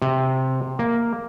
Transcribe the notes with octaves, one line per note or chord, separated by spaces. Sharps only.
C3
A#3